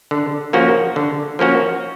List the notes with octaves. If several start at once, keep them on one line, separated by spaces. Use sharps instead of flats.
D3
F3 A#3 C#4 F#4
D3
F3 A#3 C#4 F#4